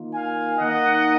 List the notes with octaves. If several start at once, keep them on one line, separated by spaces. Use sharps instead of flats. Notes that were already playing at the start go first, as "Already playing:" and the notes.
Already playing: D#3 A#3 F4
F5 G#5
D#3 A#3 D#4 D#5 F#5